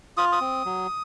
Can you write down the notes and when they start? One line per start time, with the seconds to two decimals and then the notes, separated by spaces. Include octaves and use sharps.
0.17 F4 D#6
0.32 D#6
0.41 C4
0.65 F#3